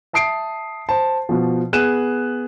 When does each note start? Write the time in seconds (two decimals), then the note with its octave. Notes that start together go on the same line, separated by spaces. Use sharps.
0.13 E5 A5 D#6 C7 D7
0.89 C5 A5
1.29 B2 F3
1.73 B3 G#4 F#6 D#7 E7